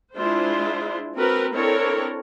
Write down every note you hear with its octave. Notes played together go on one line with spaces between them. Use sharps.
G#3 D4 E4 F4 C5
C4 F#4 A#4 B4
C4 D4 E4 A4 A#4 C#5